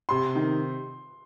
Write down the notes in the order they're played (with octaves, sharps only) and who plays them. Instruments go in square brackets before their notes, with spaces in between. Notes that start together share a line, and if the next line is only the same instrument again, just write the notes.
[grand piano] C3 [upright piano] C6
[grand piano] D#3